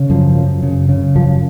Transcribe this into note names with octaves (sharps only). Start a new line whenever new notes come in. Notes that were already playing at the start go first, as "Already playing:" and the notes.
Already playing: C#3
F#2 F3
F#2
C#3
C#3
F#2 F3